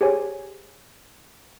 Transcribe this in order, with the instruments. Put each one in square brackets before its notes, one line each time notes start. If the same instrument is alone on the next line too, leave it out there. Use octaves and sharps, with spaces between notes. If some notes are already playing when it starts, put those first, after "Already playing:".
[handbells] G4 G#4 C5 C#5 G#5